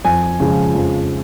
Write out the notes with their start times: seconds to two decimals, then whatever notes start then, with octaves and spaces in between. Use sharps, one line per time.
0.05 F2 G#5
0.40 C#3 F3 G#3
0.75 F2